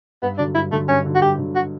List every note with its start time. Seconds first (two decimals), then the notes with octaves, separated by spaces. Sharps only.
0.22 G2 B3
0.38 D3 F#3 D4
0.55 G2 E4
0.72 D3 F#3 A3
0.88 G2 C#4
1.06 D3 F#3
1.15 F#4
1.22 G2 G4
1.38 D3 F#3
1.55 F#4